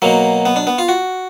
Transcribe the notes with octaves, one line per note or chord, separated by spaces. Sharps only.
B2 F#3 A#3
B3
D4
B3
F4
F#4